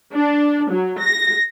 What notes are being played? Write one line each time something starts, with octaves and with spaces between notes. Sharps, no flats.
D4
F#3
A#6